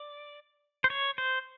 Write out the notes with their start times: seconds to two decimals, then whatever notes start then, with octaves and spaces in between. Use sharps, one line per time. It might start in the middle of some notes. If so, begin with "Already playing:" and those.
Already playing: D5
0.84 C5
0.90 C#5
1.18 C5